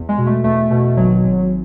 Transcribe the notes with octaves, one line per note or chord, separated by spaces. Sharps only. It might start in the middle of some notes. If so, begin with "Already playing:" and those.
Already playing: E2
G#3
B2
A3
E2 A3
B2
G#1 F#3
G#1